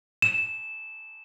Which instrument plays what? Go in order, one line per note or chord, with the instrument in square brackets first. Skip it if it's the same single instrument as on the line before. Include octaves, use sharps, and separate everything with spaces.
[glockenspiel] E7